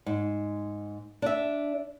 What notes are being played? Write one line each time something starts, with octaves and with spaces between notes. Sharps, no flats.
G#2
D4 E5